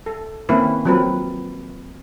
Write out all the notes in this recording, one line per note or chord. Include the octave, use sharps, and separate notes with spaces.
A4
D#3 A#3 C4 C#4 E4 B4
F3 F#3 C4 A#4 B4